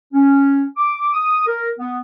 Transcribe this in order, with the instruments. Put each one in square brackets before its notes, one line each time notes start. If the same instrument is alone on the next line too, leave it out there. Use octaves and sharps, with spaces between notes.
[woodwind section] C#4
D6
D#6
A#4
B3